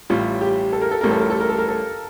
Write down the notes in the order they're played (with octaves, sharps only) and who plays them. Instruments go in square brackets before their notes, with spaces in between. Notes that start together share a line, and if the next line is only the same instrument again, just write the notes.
[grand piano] A1 A2 G3 [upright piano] F4
[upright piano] G4
A4
A#4
A4
[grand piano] A1 A2 G3 [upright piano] A#4
[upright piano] A4
A#4
A4
A#4
A4
A#4
A4